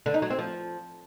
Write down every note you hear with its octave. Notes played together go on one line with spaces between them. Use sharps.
D3
D#4
F#3
C4
F3